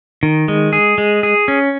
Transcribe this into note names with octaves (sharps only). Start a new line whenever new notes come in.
D#3
G#3
G#4
G#3
G#4
C#4